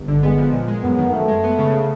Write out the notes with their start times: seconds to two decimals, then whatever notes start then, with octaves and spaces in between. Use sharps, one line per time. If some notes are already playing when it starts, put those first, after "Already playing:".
Already playing: G1
0.08 D3
0.23 G#3 B3
0.38 F3
0.52 A#2
0.68 G#3
0.83 F#2 B3
0.98 D#3
1.13 F#2 A3
1.28 G#3
1.44 B3
1.58 C#3